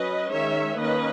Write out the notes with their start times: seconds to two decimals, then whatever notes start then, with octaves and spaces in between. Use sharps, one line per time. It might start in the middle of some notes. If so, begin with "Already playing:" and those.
Already playing: F#3 C#4 B4 D#5
0.32 D#3 G#3 C#4 C#5 E5
0.79 D#3 A#3 C#4 B4 D#5